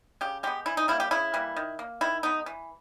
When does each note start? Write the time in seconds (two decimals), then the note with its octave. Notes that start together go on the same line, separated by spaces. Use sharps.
0.21 C#3 G4
0.43 G#3 B3 G4
0.66 E3 E4
0.77 D#4
0.88 G3 A#3 E4
1.00 G4
1.11 C#3 E4
1.34 E3 G3 A#3
1.56 D#3
1.79 A#3
2.01 D#3 E4
2.23 G#3 B3 D#4
2.46 E3